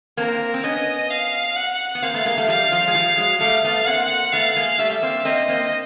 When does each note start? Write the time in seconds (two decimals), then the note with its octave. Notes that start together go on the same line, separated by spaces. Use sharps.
0.17 A#3 C4 A#4
0.54 C4
0.64 B3 C#4 D#5
1.10 F5
1.56 F#5
1.95 B3
2.02 A#3 C4 F5
2.14 A3 B3
2.25 G#3 A#3
2.37 G3 A3
2.48 F3 G3 F5
2.72 F3 G3
2.88 G#3
2.94 F3 G3
3.17 F#3 G#3
3.41 G3 A3 F5
3.64 A3 B3
3.87 A#3 C4 F#5
4.33 A3 B3 F5
4.56 G#3 A#3
4.79 G3 A3 E5
5.02 A#3 C4
5.25 A#3 C4 D#5
5.49 A#3 C4